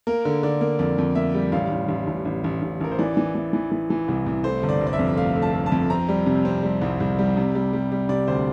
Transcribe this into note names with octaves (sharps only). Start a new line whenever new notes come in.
A#3 A#4
D3
D3 D5
A#3
F2 D5
F2
A#3 E5
G3
A1 F5
A1
A1
A1
A1
A1
A1
A1 A#4
C5
E3 D5
E3
E3
E3
E3
E3
C2
C2
A3 C5
G1
D5
G1
D5
E5
F2
A3 F5
A3
A5
A3
A5
F2
C4 A#5
G3
C3
C4
G3
C2
C2
G3
C3
G3
G3
G3
C3 D5
D2 C5